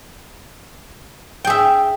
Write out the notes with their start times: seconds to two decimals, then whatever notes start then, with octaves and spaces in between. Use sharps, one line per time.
1.44 G5
1.47 G#4
1.50 E5